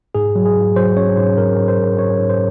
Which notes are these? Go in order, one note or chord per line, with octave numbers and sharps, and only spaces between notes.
G#2 G#4
F#3
G#4
G#2
F#3 C5
C#4 C#5
G#2 C5
G#2 A#4
G#2
C5
G#2
G#2 C#5
G#2
C5